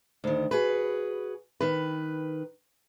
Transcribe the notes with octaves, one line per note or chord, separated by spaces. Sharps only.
D2 D#3
F#4 G#4 B4
D#3 B4